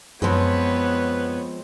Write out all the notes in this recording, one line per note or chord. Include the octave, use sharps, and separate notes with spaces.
F#2 F3 G#3 B3 C4 B4 C#5